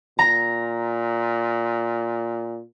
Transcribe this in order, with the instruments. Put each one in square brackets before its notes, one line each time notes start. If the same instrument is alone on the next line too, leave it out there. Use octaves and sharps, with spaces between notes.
[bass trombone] A#2 [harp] A#5